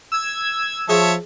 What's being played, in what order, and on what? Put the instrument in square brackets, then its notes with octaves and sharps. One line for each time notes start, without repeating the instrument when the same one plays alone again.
[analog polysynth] E6 G#6
[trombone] F3 [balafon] G#4 [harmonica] C#5 E5 A5